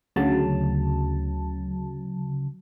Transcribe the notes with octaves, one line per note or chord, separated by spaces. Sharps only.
D2 C#3 F#3 A5